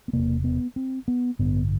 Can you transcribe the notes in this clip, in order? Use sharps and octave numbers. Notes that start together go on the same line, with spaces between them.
B3
E1 E2 C3 A#3
B3
C4
B3
A1 G2 D3 B3